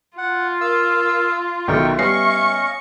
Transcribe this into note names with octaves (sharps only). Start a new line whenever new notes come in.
F4 F#5
A#4 F5 E6
B1 D#3 A4 A#4 E5 G5 C#6
G3 B3 C#4 D#5 F5 C#6 C7